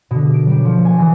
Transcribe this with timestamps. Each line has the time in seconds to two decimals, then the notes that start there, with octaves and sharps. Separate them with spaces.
0.11 B2 D3
0.34 D7
0.46 F#3 G3
0.65 F3 C#7
0.85 F#5 G#5
1.00 E3 D#6